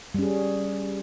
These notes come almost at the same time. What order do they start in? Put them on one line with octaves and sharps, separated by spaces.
G3 C#4 G#4